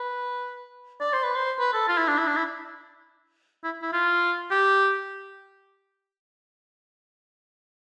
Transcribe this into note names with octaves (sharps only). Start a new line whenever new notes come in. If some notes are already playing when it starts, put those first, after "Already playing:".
Already playing: B4
D5
C5
B4
C5
B4
A4
F4
E4
D4
E4
D4
E4
E4
E4
F4
G4